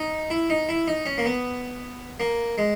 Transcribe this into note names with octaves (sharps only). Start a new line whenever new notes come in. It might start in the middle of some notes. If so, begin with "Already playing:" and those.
Already playing: D#4
E4
D#4
E4
D#4
C#4
A#3
B3
A#3
G#3